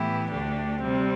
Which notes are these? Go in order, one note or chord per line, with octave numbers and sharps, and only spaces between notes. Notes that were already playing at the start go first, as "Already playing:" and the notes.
Already playing: A2 E3 B3 E4 G4
D2 D3 A3 D4 G4
C3 G3 C4